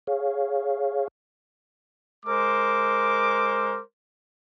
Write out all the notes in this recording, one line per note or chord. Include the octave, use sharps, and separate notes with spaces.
G#4 C#5 F5
G#3 A#4 C5 D6